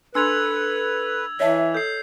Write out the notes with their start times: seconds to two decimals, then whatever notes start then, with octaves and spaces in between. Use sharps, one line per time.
0.15 D4 A4 B4 C6 E6 G#6 F7
1.40 E3 C#5 D#5 E5 A5
1.74 A4 G6 C7